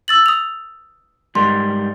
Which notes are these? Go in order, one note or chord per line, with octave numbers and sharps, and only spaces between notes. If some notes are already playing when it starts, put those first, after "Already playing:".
E6 A6 F#7
D#6 F7
G#2 G3 A#4 C6